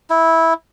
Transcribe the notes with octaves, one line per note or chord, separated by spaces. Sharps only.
E4